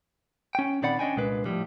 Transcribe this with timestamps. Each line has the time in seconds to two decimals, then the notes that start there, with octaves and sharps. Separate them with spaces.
0.55 C#4 G5
0.82 A#2 D#3 C4 D5 F#5 B5
0.99 C#4 D4 D#5 G5 G#5
1.16 C2 A#2 G#3 D4 B4
1.45 A2 F3 G3